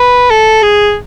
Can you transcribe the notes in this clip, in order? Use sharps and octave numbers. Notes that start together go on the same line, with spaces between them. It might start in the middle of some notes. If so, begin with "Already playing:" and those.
Already playing: B4
A4
G#4